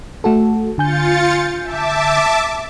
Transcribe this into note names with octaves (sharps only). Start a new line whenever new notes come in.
A3 F#4 A4
D3 F4 G#5 G6 A6 C#7
E5 A5 D6